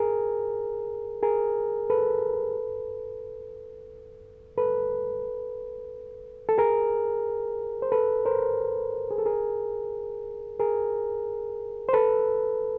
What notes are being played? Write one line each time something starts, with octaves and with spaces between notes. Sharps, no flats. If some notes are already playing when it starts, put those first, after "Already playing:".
Already playing: G#4 A#4
G#4 A#4
A4 B4
A4 B4
A4
G#4 A#4
C5
A4 B4
A#4 C5
G#4
A4
G#4 A#4
G#4 A#4
C5
A4 B4